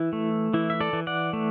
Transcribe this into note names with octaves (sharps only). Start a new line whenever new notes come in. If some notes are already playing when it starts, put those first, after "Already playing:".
Already playing: E3 E4
A3
E3 E4
E5
A4 D5
E3
D5 F#5
A3